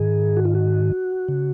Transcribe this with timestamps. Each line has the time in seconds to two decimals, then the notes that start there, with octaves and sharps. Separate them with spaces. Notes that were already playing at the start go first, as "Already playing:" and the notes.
Already playing: G#2 D#3 G#4
0.37 F#4
0.45 F4
0.55 F#4
1.28 C#3